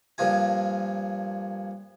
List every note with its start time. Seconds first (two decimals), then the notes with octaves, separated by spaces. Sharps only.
0.18 G2 A#2 F3 F4 G#5